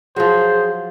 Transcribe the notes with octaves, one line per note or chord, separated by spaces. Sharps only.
F3 F#3 G#4 C5